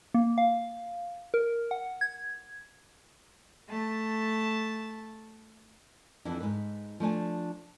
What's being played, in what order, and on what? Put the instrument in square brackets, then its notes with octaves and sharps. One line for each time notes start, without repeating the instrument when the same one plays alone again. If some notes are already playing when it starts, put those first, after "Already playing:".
[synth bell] A#3
F5
A#4
F#5
G#6
[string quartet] A3 A5
[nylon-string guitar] F2 E3 D4 E4
G#2 B4
F3 A3 D4 G#5